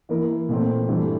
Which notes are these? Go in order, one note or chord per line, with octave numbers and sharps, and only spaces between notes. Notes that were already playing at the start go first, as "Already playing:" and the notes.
E3 A#3 E4 A#4
A#2 A3 C4
G2 E3 A3